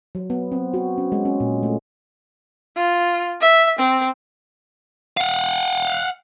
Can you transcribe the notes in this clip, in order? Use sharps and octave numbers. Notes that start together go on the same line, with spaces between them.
F#3
B3
C4
F#4
C#4
G#3
C#4
A#2
A3
F4
E5
C4
F5 F#5